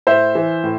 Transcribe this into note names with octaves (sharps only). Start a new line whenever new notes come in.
A2 C5 E5
E3
A2